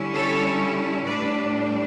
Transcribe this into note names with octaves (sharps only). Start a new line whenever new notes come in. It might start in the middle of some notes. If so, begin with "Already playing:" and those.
Already playing: D3 G3 C#4 E4
A4 C#5
A2 G3 D4 B4 D5